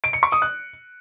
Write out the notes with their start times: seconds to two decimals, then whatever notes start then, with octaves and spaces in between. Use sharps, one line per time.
0.04 D7
0.13 C#7
0.23 C#6
0.32 D#6
0.42 F#6